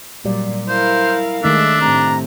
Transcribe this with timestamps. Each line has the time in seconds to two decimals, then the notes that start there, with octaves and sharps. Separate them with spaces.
0.25 A#2 F#3 G3 D5
0.68 E4 A#4 C5 F5
1.44 D#3 G#3 A3 D4 D#4 E5
1.81 A2 C3 A#5